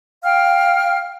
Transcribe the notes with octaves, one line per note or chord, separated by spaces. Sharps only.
F5 G5 F6